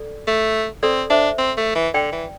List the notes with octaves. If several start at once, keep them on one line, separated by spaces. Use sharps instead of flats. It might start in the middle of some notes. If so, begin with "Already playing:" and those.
Already playing: A4 D5
A3
C4 A4 D5
D4 C5 E5
C4
A3
E3
D3 D5 G5
E3